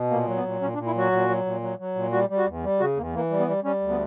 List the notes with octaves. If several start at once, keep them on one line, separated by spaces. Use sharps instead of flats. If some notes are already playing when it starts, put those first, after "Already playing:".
Already playing: B2
A#2 A#3
F#3
B3
A#2
A#2 C#4
D4
A#2
E4
F#3 F#4
A#2
F#3
A#2
F#3
F#3
A#2
G3 F#4
G3
F#4
E2
G3
C#3 F#4
E2 A#3
E3 A#3
G3
B3
G3
G3 C#4
D2
B3